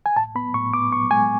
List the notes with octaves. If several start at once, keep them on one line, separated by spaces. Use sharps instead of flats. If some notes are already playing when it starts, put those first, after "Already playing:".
G#5
A2 A5
B3 B5
A2 C#6
B3 D6
B3 C#6
G#3 G#5